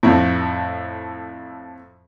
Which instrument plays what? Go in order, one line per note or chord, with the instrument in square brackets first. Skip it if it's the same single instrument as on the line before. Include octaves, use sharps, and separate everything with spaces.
[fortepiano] F2 A2